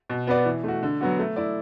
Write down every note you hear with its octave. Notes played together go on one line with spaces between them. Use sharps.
B2
B3 F#4 B4 D5
E3
A3 F#4
D3
F#3 B3 F#4
A3
E4 D5